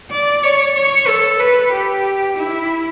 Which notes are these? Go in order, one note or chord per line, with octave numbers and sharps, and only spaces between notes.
D5
C#5
C#5
A4
B4
G4
E4